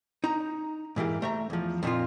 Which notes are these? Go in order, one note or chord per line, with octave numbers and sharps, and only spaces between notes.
D#4 A#5
G#2 E3 A#3 G4
A3 E5 A#5
E2 F3
F2 A#2 D3 D#3 F4